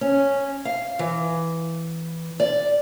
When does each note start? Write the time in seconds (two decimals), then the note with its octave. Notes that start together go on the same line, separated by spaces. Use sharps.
0.01 C#4
0.65 F5
0.99 E3
2.40 D5